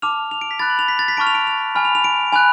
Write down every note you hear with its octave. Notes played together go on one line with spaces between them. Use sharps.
A5 D6 F6 F7
F7
D7
B6
B5 F#6 A6
F#7
F7
B6
A6
B6
A5 C#6 F6 D7
F7
D7
F7
G#5 B5 F6
F7
F7
D7
G#5 B5 F#6